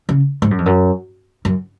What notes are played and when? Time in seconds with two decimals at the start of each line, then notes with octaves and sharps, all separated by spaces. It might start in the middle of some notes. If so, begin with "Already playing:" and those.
0.09 C#3
0.42 G#2
0.51 F#2
0.58 F2
0.66 F#2
1.45 F#2